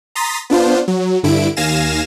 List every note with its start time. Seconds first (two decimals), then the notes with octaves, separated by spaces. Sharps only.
0.15 A#5 C6 D#6 A6 B6
0.50 B3 D4 F4 C5
0.88 F#3
1.23 G2 D3 E4 D7
1.56 D#2 F5 G#5 A#6 E7